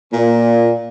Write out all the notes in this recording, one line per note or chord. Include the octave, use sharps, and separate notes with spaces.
A#2